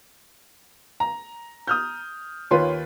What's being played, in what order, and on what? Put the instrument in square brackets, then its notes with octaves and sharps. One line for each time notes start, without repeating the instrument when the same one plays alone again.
[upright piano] A#5
[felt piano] D#6 F6 G6
[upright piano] D#2 F4 B4 [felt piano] C#5 C6